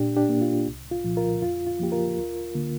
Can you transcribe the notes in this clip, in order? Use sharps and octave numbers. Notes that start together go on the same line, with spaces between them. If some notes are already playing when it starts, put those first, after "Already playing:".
Already playing: A#2 D4 G4
D4 G4
A#3
F4
C2
F4
A#2 F3
F4 A#4
F2 F4
F4
F3 A#3 G4
F4 A#4
D2
D3 A#3